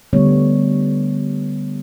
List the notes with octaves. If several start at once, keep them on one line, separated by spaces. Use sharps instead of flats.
D3 G3 A3 B3 C#5